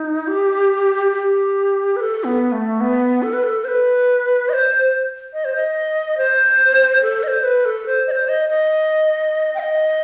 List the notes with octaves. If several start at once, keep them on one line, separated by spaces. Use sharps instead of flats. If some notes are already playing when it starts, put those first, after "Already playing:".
Already playing: D#4
G4
G4
B4
A4
B3
A3
B3
A4
B4
A4
C5
B4
D#5
C5
D#5
C5
D#5
C5
A4
D#5
C5
B4
A4
C5
D#5
C5
D#5
D#5
G5
D#5